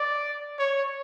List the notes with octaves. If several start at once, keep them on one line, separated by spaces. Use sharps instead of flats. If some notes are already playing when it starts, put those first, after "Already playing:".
Already playing: D5
C#5